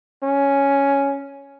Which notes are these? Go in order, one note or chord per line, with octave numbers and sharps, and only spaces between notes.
C#4